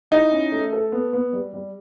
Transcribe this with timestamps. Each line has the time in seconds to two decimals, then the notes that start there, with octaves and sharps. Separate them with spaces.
0.11 D#4 E4
0.31 C#4
0.52 A3
0.72 A4
0.92 B3
1.13 B3
1.33 G3
1.53 G3